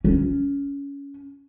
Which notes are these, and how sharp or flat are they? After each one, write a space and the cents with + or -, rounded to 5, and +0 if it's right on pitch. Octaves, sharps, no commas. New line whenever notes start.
C#4 +15